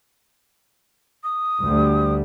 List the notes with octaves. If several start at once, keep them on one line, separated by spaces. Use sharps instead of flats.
D#6
D2 G3